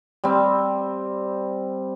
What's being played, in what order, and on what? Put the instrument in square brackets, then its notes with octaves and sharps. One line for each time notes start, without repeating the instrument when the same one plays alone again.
[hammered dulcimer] G3 C4